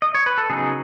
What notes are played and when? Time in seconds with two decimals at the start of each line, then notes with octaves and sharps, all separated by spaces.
0.02 D#5
0.15 C#5
0.26 B4
0.38 A4
0.50 C#3 F#3 B3 D#4 G#4